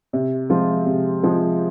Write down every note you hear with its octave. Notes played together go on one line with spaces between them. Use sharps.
C3
F3 G#3 C4 F4
C3
F3 G#3 C4 F4